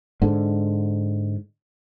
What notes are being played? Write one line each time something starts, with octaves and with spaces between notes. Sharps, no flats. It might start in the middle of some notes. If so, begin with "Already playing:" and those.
G#2 D3